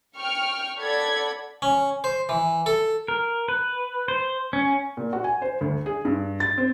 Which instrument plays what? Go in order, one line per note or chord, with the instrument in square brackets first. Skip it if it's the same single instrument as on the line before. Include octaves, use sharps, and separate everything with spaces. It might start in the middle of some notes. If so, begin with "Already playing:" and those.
[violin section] G5 C#6 F6
A4 D5 F#5 B5 G#6
[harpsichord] C#4
C5
E3
A4
[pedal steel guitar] A#4
B4
C5
C#4
[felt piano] A#2
F#4
G#5
C5
D2
G#4
G2
A6
C4